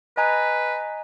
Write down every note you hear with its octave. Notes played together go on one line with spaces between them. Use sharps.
B4 D#5 G#5 A#5